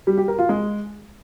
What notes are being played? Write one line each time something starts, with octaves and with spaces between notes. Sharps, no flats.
G3
G4
A#4
F4
G#3